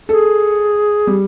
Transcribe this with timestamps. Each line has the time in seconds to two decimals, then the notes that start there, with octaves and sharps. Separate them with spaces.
0.09 G#4 A4
1.07 G3